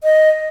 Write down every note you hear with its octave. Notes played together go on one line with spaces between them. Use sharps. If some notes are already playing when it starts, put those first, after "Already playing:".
D#5